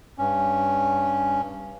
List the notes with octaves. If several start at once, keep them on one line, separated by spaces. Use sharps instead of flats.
G2 C#4